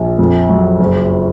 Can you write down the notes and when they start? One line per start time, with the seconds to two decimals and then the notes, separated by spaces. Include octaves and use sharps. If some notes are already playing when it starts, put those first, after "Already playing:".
Already playing: A#1
0.19 F2
0.49 F#3
0.79 F#1